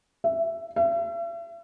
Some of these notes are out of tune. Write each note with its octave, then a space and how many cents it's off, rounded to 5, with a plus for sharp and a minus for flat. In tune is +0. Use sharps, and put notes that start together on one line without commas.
E5 +10
E5 +40